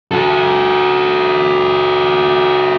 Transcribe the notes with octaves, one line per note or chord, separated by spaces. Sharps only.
F#4 A4